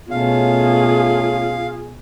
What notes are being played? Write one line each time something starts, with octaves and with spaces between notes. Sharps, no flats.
B2 A3 C#4 F4 G#4 C#5 F5